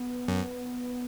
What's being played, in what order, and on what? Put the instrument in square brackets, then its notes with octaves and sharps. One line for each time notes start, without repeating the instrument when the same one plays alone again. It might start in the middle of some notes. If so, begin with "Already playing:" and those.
Already playing: [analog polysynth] B3
[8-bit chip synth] F#2